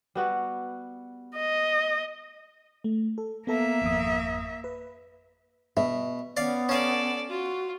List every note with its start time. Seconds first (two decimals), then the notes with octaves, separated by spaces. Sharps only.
0.15 G3 B3 F#4
1.36 D#5
2.84 A3
3.18 A4
3.47 A#3 B3 A4 E5 A#5
3.82 G#1 F2 D#6
4.64 B4
5.77 B2 E5
6.37 B3 C#4 D5 F5
6.69 C#4 A4 D5 F5
7.30 F4 F#4